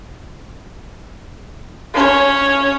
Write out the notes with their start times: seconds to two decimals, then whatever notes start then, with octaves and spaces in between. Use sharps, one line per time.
1.94 C#4 C#5